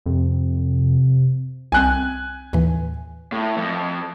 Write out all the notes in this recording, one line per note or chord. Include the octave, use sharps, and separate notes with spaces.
F2 C3
C2 C4 G#5 F#6
D#2 A2 E3
A2
F2